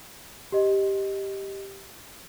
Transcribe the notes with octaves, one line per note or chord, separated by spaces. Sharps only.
G4 D#5